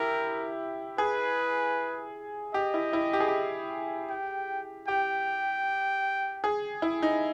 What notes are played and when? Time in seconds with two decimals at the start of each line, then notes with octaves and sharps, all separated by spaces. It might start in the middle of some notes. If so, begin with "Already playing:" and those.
Already playing: E4 G4 A#4
0.98 G#4 B4
2.54 G4 D#5
2.74 E4
2.93 E4
3.13 G4
3.20 G#4
3.28 G4
4.10 G5
4.88 G4 G5
6.44 G#4
6.82 E4
7.02 D#4